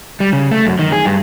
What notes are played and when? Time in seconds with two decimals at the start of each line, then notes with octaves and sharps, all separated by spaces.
0.20 G3
0.33 C#3
0.51 A3
0.66 F#2
0.79 D#3
0.92 G#4
1.05 G2